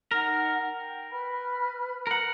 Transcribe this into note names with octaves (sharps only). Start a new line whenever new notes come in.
D#4 A#4 F#5 F6
G5
B4 B5 F6
A#4 F#5